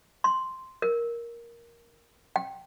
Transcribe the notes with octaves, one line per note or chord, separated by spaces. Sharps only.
C6
A#4
G5